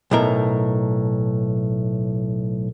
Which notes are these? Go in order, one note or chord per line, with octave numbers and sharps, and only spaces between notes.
B1 A2 A#4